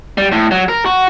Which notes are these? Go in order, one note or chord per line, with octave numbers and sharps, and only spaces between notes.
G3
A2
F#3
A#4
F#4